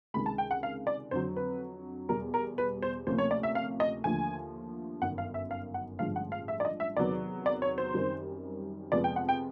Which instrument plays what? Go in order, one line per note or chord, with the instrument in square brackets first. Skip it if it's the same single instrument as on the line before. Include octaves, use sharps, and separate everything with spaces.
[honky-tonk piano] C#2 C3 D#3 G#3 B5
A5
G5
F#5
F5
D5
F2 D3 F#3 C5
B4
E2 B2 G3 A#4
A#4
B4
C5
D2 C3 F3 A#3 C#4 C5
C#5
D5
E5
F5
D#5
D#2 D3 F3 A3 G#5
G1 F#2 D#3 F#5
F5
E5
F5
F#5
A1 G2 D3 F3 G#3 F5
F#5
F5
E5
D5
D#5
E5
E2 C3 D#3 F#3 B3 D5
D5
C#5
C5
F#2 D#3 G3 C4
F2 C3 F3 G#3 B3 D5
G5
F#5
G5